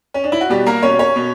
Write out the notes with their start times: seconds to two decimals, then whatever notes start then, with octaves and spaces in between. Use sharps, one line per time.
0.14 C#4
0.24 D4
0.32 E4
0.41 F#4
0.49 B2 G3 G4
0.66 A#3 A#4
0.82 B2 C#4 C#5
0.99 C#4 C#5
1.16 B2